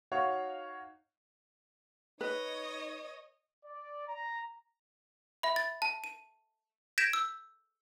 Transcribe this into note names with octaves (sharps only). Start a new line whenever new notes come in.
D#4 F#4 C#5 F5
D#4 B4 C#5 D#5
D5
A#5
E5 B5
A6
A5
D#7
G6 G#6 A#6 B6 D7 E7
E6